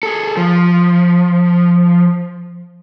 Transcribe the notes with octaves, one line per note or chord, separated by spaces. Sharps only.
G#4 A4
F3